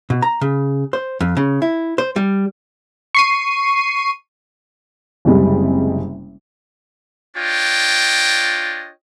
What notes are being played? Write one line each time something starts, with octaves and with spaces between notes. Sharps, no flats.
B2
A#5
C#3
C5
F2
C#3
E4
C5
G3
C#6 C7 D#7
F#1 C3 G3 G#3
D4 F4 C#5 D#5 G5